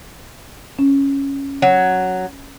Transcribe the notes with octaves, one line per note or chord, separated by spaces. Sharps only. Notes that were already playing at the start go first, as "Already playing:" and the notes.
C#4
F#3